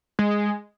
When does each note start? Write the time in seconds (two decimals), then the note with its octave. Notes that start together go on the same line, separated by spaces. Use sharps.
0.19 G#3